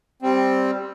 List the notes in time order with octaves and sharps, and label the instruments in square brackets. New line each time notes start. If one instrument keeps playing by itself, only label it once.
[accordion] G3 C4